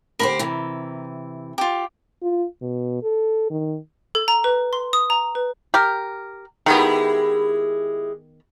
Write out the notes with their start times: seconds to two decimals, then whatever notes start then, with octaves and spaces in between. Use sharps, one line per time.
0.19 D2 G4 A#4 C5 B5
0.39 C3 E3
1.58 F4 G4
2.22 F4
2.62 B2
3.03 A4
3.50 D#3
4.15 A4
4.28 A#5
4.44 B4
4.73 C6
4.93 D#6
5.10 A#5
5.35 B4
5.74 G4 A#4
6.66 D#3 G#3 B3 E4 G4